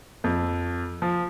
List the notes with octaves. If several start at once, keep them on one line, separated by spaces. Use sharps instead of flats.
F2
F3